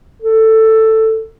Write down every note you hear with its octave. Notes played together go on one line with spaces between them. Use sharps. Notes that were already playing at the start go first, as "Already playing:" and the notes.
A4